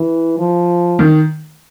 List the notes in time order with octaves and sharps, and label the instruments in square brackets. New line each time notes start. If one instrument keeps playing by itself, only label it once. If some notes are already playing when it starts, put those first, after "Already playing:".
Already playing: [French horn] E3
F3
[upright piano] D#3